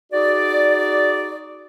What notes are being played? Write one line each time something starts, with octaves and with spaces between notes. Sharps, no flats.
D#4 F#4 G#4 D5